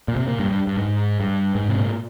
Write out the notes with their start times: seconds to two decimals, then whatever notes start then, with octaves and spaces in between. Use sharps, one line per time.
0.08 A#2
0.16 C3
0.28 A#2
0.39 G2
0.51 G2
0.67 G2
0.77 G#2
1.20 G2
1.55 G#2
1.69 C3
1.79 A#2